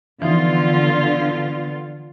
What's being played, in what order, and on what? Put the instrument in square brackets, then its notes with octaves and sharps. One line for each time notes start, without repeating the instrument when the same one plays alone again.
[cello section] D3 B3 F4 [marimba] E3 F3 D#4